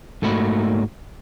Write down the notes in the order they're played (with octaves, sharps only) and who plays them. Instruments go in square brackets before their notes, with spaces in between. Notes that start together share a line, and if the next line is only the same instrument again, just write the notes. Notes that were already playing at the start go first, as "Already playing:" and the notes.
[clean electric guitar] G#2 A3 A#3 F#4 B5